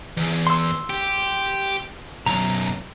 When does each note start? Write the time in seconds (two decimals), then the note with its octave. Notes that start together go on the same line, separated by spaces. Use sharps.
0.17 E2
0.47 C6 E6
0.90 G4
2.26 B1 F#2 A#5